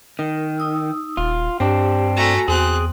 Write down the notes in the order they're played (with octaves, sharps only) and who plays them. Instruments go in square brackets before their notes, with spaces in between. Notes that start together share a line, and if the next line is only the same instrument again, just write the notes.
[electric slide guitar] D#3 [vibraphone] A#4
[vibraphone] D#4 D#6 E6
[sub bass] D#1 [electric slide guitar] F4
[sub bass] G2 [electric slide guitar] C4 D4 [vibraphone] G4
[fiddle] A3 A#5 [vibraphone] F#4 G#5
[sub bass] E2 [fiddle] C4 F#6 [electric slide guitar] G#4